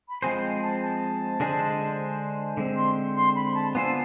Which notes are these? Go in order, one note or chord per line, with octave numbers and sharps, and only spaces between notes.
B5
F3 G#3 C4 G#4 C5 G#5
A5
A5
D3 G#3 D4 G#4 C5
D3 G#3 C4
C6
C6
B5
A5
B3 D4 F4 A4 C5 G#5